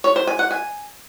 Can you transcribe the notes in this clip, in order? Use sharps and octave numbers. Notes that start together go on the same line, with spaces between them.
C#5
C5
G#5
F#5
G#5